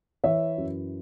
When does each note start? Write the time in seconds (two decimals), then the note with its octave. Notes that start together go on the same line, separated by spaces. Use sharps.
0.24 E3 C#5 E5
0.58 F#2